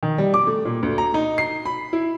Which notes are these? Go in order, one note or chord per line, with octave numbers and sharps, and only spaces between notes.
D#3
G3
D6
A3
A#2
D2
A#5
D#4
C7
B5
E4